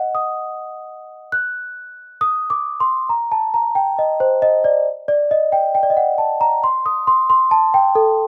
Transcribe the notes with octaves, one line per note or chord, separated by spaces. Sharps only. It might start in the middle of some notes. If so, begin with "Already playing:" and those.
Already playing: D#5 F#5
D#6
F#6
D#6
D6
C6
A#5
A5
A#5
G5
D#5
C5
D#5
D5
D5
D#5
G5
G5
D5
D#5
F#5
A5
A#5
C6
D#6
C6
C6
A5
G5
A4